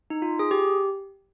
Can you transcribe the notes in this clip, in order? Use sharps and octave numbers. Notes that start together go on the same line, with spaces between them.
D#4
F4
G#4
G4